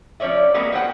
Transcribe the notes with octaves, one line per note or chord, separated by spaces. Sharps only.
F3 C#4 C#5 D5 E5
E3 G#3 A#3 B3 C#4 F#4
F#4 C5 D5 F#5 G5